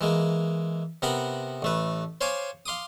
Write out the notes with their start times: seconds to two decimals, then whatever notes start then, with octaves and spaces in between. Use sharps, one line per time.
0.01 E3 G#3 A#3
1.02 C3 B3 A#4 F#5 B5
1.62 A1 A3 B4
2.21 C5 C#5 F5 G#5 D6
2.66 F5 C6 D6 D#6